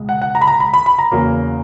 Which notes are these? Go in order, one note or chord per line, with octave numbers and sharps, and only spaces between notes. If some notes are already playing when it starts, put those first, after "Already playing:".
Already playing: C#2 B2 G#3
F#5
F#5
A#5
B5
A#5
B5
B5
B5
A#5
E2 C#3 F#3 A#3